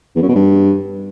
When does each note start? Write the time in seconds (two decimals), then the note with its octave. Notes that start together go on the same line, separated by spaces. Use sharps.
0.16 E2
0.22 F#2
0.29 B2
0.35 G2